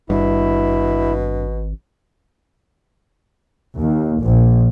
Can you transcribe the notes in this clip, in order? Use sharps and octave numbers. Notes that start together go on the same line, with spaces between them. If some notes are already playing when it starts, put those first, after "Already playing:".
G#1 G2 B2 E4
D#2
A#1